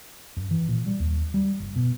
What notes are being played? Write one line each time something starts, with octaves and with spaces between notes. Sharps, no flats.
F#2
E3
A#2
G3
D#2
G3
F#1
B2